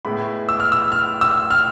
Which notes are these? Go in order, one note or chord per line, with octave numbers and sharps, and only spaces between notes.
A2 G#3 B3 E4 B5
E6
F6
E6
F6
E6
F6